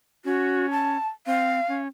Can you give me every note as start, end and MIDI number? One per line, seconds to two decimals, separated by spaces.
0.25 0.97 61
0.25 0.69 66
0.71 1.07 81
1.27 1.60 60
1.27 1.76 77
1.68 1.87 61